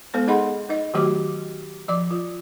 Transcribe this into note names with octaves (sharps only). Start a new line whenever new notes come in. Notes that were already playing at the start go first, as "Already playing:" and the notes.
G#3 B3 A4 C5
D#4 G#4 D#5 F#5 B5 C6
D#4 D#5
D#3 F#3 A3 F#4 G4 D6
F3 D5 D6
F4